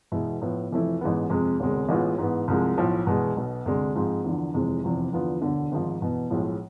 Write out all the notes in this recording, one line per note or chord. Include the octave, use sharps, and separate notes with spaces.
E2 B2 G#3 B3 E4
A2 F3 B3 E4
F1 F2 E3 A3 E4
A1 G#2 E3 G#3 B3
F2 C3 G#3
E1 D2 C3 G#3
A1 A2 G#3 B3 F4
G#2 E3 B3
C2 C3 F3 G#3
B1 A2 F3
E2 B2 G#3
B1 B2 B3
D2 C3 G#3 D4
G#2 F3 G#3 C4
E2 D3 F3
F1 F2 C3 E3 G#3
F1 E2 C3 F3
E2 D3 F3 B3 F4
E1 D2 D3
G#1 G#2 F3
E2 B2 B3
B1 A2 F3 G#3